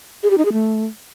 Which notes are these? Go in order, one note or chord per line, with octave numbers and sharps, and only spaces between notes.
G#4
G4
D#4
G#4
A3